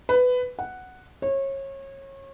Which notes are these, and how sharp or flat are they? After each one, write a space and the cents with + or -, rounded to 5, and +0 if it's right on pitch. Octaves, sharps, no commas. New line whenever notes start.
B4 +15
F#5 +0
C#5 -30